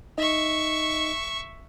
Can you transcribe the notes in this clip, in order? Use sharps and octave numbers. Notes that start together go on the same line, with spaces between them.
D#4 D#5 E5 C#6